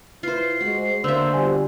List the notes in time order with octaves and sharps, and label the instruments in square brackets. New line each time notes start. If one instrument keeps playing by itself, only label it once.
[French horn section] E4 B4 [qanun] F4 C5 [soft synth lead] C7
[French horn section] G#3 C5 [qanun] F#4
[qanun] D3 E5 [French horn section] A#3 [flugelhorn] C5 [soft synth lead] E6
[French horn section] B2 F3 G3 [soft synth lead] G#5